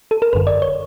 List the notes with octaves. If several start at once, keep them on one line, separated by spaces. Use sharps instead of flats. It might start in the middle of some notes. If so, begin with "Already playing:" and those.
A4
A#4
G1 F#2 D3 B4
D5
C#5